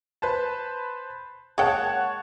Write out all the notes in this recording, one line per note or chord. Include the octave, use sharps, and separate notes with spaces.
B4 C5 A5
G#3 A#3 C#5 F#5 G5 A5